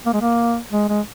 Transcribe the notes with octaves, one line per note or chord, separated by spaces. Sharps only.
A#3
G#3
A#3
G#3
G#3